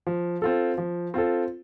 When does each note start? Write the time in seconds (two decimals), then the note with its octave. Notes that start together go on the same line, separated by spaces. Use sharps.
0.07 F3
0.42 C4 F4 A4
0.78 F3
1.14 C4 F4 A4